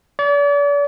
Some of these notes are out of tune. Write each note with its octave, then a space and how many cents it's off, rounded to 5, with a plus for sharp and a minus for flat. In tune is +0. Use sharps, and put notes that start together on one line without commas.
D5 -40